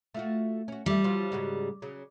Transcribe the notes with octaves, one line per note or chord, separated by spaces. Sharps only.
A3 F4 F#4
C#4 F#4
F3 G3 A3
F3 F#3 F4
G#2 C#3 F#4
C#3 F#3